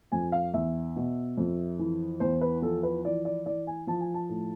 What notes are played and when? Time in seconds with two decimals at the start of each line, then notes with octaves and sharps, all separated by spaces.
0.12 F2 G#5
0.32 F5
0.54 E2 E5
0.96 B2
1.37 F2
1.79 E3
2.20 E2 C5
2.41 B4
2.62 F3 A4
2.83 B4
3.04 E3 D5
3.25 D5
3.46 E3 D5
3.67 G#5
3.87 F3 A5
4.00 G#5
4.14 A5
4.29 A2